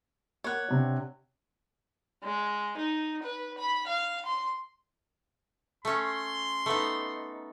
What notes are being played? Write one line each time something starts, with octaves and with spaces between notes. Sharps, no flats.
A#3 C#5 F#5
C3 D4
G#3
D#4
B4
B5
F5
C6
A3 C#4 C6
A3 B3 D#4